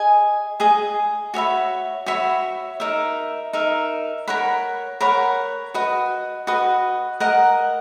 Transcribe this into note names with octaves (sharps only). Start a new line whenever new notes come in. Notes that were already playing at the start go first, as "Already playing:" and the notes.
Already playing: G#4 D#5 G#5
G#4 D#5 G#5
F#4 C#5 E5 B5
F#4 C#5 E5 B5
D#4 A#4 E5
D#4 A#4 E5
A#4 C#5 F#5 B5
A#4 C#5 F#5 B5
F#4 B4 D#5
F#4 B4 D#5
A#4 D#5 F#5 A#5